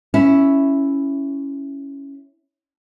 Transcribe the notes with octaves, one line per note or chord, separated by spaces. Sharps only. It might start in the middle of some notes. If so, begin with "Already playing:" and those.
C#4 E4